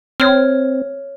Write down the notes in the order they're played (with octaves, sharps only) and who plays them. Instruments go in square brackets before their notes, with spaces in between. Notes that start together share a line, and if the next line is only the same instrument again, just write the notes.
[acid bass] C4 [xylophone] C#5 F6